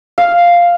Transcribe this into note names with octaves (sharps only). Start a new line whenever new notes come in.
F5